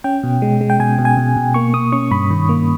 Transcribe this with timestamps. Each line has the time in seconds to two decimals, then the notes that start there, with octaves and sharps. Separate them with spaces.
0.04 C#4 G5
0.23 B2
0.42 G#3
0.61 G#3
0.70 G5
0.80 B2 G#5
0.99 B2
1.05 G#5
1.17 B2
1.36 B2
1.54 A#3 C#6
1.74 A#3 D#6
1.92 C#4 C#6
2.11 G2 B5
2.30 D#3
2.49 A#3